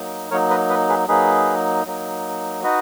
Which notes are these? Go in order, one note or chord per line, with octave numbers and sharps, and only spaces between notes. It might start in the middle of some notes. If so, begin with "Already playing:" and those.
Already playing: F#3 A#3 D#4
F#3 A#3 D#4 A#4 C#5
B4 D#5
B4 D#5
G#4 B4
F#3 A#3 D#4 G#4 B4
F#3 A#3 D#4
D#4 F#4 B4 D#5